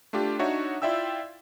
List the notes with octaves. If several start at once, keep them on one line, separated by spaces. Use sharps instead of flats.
A3 D4 F4 G4
D4 D#4 F#4 C#5 E5
E4 F4 D5 E5 G5 E6